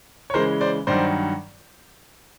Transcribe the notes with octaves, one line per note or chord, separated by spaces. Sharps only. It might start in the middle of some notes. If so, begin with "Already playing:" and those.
C#5
C#3 E3 G#3 A#4 C5
C5 D5
G2 D#3 F#3 C5 D5